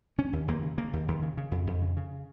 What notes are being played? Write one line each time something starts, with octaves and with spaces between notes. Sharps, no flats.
C#3 C#4
D#2
D#2 A#3
C#3
C#3 A#3
D#2
D#2
C#3
C#3
F2
F2
C#3
C#3